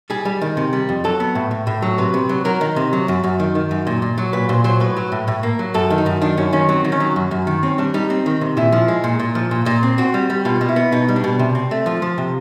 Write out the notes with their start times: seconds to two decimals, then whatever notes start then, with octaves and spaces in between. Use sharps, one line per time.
0.10 G3 G#4
0.25 G3
0.41 D#3
0.57 C3
0.73 G3
0.89 F2
1.04 F#3 A4
1.20 B3
1.35 A2
1.51 A2
1.67 A2
1.82 F#3
1.98 C3 B4
2.14 C3
2.29 F#3
2.45 F#3 A#4
2.61 D#3
2.76 C3
2.93 F#3
3.08 F#2
3.24 F#2
3.40 D#3
3.55 D#3
3.71 F#2
3.87 A#2
4.02 A#2
4.18 F#3
4.33 A#2 B4
4.49 A#2 C5
4.64 F#3 C5
4.80 A2 B4
4.97 F#3
5.12 A2
5.28 A2
5.43 A#3
5.59 F#3
5.74 F#2 A4
5.90 D#3
5.98 D#4
6.06 F#2
6.22 D#3 D4
6.37 F#2 C#4
6.53 D#3 C#4
6.69 F#3 C4
6.85 D#3
6.92 C#4
7.00 F#3
7.16 F#2
7.31 F#2
7.47 D#3
7.63 C4 C#4
7.78 G3 D4
7.94 G3 D#4
8.10 C4
8.26 D#3
8.41 C3
8.57 A#2 E4
8.72 F3
8.88 G#3
9.04 A#2
9.20 A#2
9.35 F3
9.51 A#2
9.66 A#2
9.83 C4
9.98 C4 F#4
10.14 G3
10.30 G3
10.45 B2 F4
10.61 B2
10.69 E4
10.76 B3
10.92 B2 D#4
11.09 G3
11.16 D4
11.24 B2
11.39 C3
11.55 C4
11.71 A3
11.86 F3 F4
12.02 F3
12.18 C3